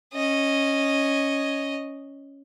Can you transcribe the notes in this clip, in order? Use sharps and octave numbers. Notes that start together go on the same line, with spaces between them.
C#4 D#5